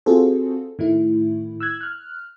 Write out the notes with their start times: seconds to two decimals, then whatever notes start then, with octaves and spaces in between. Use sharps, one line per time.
0.06 C4 F4 F#4 G#4 A4 C5
0.79 A2 D#3 A3 E4
1.60 E6 F#6 G#6
1.81 F6 F#6